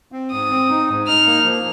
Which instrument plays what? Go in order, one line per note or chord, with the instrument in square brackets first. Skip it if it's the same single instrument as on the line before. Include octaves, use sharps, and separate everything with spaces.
[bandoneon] C4
[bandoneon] G#2 [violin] D#6
[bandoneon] C4
D#4
G#2
[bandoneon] D#4 [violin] F6
[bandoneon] A#3
F3